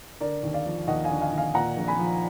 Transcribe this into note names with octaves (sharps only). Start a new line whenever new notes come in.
D3 A#4 D5
D#2
D5 F5
F3
D#2 D#5 F#5
F5 G#5
D3
F5 G#5
D#2
F5 G#5
A#2 F#5 A#5
A#1
G#5 B5
F3